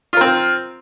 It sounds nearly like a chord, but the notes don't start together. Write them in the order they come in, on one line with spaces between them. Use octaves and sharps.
F4 A#4 C4